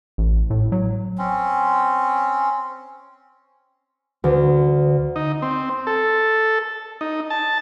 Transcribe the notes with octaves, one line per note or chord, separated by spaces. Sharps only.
A1
A2
F#3
C4 C#4
D2
D#4
C4
A4
D#4
A5